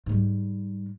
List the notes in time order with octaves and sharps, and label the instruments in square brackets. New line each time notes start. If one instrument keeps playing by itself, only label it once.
[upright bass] G#2 G3